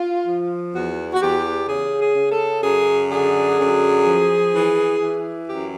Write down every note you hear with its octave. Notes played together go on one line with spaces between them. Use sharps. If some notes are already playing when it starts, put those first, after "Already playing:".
Already playing: F4
F3
E2 F#4
F#4
E2 G4
C#3 G#4
G#4
C#3
A4
F#2 G#4
D3 G#4
F#2
F3
E3
E3
F#2 G4